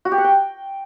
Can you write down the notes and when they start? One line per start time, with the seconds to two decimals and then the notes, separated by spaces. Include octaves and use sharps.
0.05 F#4
0.12 G4
0.18 F#5
0.24 G5